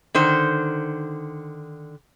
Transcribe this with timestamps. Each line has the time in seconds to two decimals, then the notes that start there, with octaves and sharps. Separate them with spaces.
0.15 D3 D#3 C5